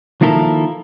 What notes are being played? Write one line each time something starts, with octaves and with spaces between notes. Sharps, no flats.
D#3 F3 A#3 E4 A4 A#4